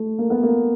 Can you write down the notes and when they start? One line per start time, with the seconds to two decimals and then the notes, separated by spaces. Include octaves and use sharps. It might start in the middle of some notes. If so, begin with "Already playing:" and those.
Already playing: A3
0.18 A#3
0.30 B3
0.43 A#3